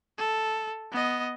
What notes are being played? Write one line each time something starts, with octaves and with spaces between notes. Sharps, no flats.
A4
B3 D#5